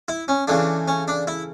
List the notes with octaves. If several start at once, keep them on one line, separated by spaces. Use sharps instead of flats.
E4
C#4
C#3 E3 A3 D4
C#4
D4
E4